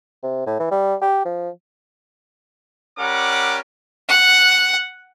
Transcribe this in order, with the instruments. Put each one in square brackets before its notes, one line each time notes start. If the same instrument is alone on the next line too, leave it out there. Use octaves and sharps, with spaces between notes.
[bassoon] C3
A2
E3
G3
G4
F3
[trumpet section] G3 C#4 A#4 F#5 B5 D6
[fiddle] F#5